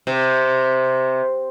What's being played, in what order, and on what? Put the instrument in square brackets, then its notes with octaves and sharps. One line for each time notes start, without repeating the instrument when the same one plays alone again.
[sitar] C3